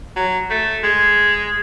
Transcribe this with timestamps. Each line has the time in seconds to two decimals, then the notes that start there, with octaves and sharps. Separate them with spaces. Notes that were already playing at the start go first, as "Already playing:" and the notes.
0.17 F#3
0.50 A3
0.84 G#3